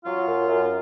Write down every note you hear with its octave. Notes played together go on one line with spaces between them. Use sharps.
F#3 F4
F#2
F#2